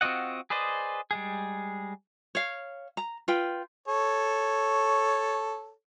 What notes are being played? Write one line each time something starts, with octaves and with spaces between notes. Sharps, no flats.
C4 F4 F#4 D#5 F#5
G#4 B4 C5 D5 D#5
G3 G#3 G#4
C#5 F5
A#5
F4 B4 G5
A4 C#5